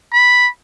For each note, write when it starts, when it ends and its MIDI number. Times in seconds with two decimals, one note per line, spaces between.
0.13 0.48 83